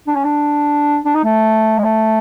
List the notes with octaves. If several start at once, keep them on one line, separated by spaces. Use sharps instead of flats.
D4
C#4
D4
D4
D#4
A3
G#3
A3